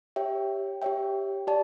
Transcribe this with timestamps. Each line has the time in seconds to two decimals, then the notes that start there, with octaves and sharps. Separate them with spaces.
0.16 G4 C#5 E5 G5
0.82 G4 C#5 E5 G5
1.47 G4 D5 A5